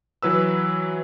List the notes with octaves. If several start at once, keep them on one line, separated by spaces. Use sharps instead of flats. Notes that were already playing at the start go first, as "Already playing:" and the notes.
E3 F#3 B4 E6